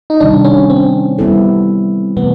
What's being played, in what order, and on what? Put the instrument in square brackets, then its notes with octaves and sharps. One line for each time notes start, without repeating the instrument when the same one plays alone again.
[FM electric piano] D#4
[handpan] C3 D#3 G3 [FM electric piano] D4
[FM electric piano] C#4
C4
[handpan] G3 B3 E4 A4
[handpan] C3 E3 A3 [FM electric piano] B3